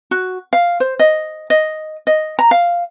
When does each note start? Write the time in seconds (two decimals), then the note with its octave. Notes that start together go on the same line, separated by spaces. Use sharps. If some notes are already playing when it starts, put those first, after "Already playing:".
0.11 F#4
0.53 F5
0.80 C5
0.99 D#5
1.50 D#5
2.07 D#5
2.39 A#5
2.51 F5